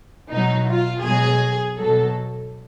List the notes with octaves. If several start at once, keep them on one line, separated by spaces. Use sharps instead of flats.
B2 F#3 D#4
F4
B2 F#3 G#4
B2 F#3 A4